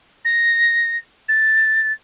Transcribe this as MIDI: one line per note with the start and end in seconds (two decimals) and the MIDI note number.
0.25 0.97 94
1.28 1.93 93